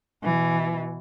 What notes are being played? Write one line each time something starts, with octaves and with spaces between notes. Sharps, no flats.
B2 E3